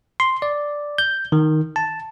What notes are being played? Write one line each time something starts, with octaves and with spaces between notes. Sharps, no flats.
C6
D5
G6
D#3
A5